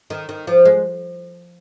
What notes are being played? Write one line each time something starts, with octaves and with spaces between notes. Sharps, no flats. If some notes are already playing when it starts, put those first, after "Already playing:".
D#3
D#3
F3
G#3